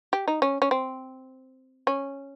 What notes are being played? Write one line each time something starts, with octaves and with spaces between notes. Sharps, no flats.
G4
D#4
C#4
C#4
C4
C#4